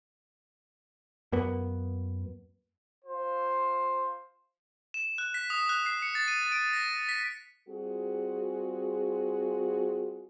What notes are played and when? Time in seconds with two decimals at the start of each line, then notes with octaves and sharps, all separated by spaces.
1.32 F#2 A#3 B3
3.05 F4 C5
4.94 E7
5.18 F#6
5.34 B6
5.50 D#6
5.69 F#6
5.86 C7
6.02 C#7
6.15 A6
6.28 D#7
6.52 D7
6.73 A#6
7.09 B6
7.69 G3 C4 F4 F#4 G#4